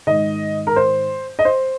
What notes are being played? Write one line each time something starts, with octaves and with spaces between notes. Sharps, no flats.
G#2 D#3 D#5
A#4
C5
D#5
C5